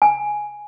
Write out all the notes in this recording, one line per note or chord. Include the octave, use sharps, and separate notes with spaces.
G#5